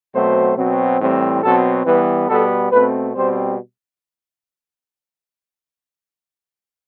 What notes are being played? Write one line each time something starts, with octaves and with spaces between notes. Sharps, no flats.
B2 F#3 A3 C4 C5
B2 F#3 C4
A2 E3 G3 C4
B2 F#3 C4 A4
E3 G3 B3 B4
B2 G3 B3 A4
B2 A3 C4 B4
B2 G3 C4 C5